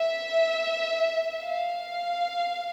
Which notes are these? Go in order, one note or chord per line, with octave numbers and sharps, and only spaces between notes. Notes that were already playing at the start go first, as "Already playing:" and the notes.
Already playing: E5
F5